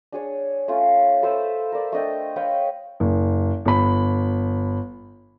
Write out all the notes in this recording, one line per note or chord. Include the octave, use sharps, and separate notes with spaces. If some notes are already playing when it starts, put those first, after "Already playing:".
D4 G#4 C#5
A3 C#4 F4
A4 B4 C5 E5
A#4 D5
A3 D4 D#5 G5
B4 C#5 F5 G5
F#1
G1 B5